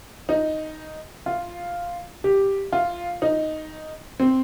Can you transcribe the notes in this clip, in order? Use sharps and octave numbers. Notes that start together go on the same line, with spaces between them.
D#4
F4
G4
F4
D#4
C4